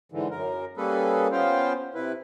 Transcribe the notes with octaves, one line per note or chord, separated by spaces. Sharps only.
G#2 D3 E3
F#2 A#4
G3 A#3 C#4 G#4 A4 B4
B3 C#4 F4 C5 F5 G5
C3 E4 B4